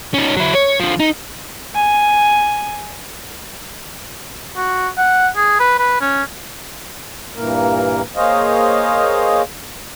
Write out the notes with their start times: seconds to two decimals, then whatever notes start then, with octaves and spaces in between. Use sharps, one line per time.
0.14 C#4 D#4
0.37 F#3 E4
0.55 C#5
0.80 D3 F3
1.00 D#4
1.75 G#5
4.56 F#4
4.98 F#5
5.36 G#4
5.60 B4
5.79 B4
6.01 C#4
7.36 G2 A#2 E3 A#3 A#4
8.16 A#3 G#4 C5 C#5 D#5 F5